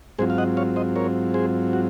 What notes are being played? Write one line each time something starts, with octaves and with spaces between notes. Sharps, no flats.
G#2 F#3 C4 F4 G#4 C5
F5
D#5 F#5
C#5 F5
C5 D#5
A#4 C#5
G#4 C5
F#4